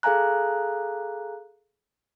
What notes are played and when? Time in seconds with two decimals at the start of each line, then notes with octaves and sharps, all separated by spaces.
0.03 G#4 A4 F5 G#5 A#5 F#6